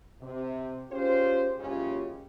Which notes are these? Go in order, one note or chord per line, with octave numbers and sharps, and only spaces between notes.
C3
C#4 F4 G4 G#4 C5
F#1 C#3 G#3 C#4 F4 G4